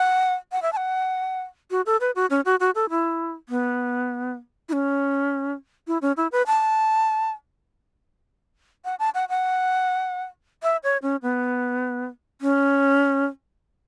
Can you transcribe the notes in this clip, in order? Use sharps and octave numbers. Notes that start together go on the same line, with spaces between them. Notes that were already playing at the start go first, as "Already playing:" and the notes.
Already playing: F#5
F#5
E5
A5
F#5
F#4
A4
B4
F#4
C#4
F#4
F#4
A4
E4
B3
E4
C#4
E4
C#4
E4
B4
A5
F#5
A5
F#5
F#5
E5
C#5
C#4
B3
C#4